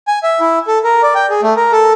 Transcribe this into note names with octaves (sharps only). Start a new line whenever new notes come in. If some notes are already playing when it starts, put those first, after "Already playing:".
G#5
E5
E4
A4
A#4
D5
G5
G#4
A3
A#4
A4